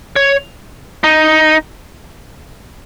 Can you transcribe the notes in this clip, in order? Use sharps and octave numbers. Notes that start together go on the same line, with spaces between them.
C#5
D#4